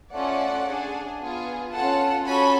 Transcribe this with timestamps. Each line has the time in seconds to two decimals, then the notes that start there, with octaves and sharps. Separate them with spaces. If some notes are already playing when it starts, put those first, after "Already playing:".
0.13 A3 C#4 F4 D5 F#5
0.66 D4 G#4
1.20 B3 F4 G#4
1.73 C#4 F4 A4 F#5 A5
2.26 C#4 F#4 A4 G#5 B5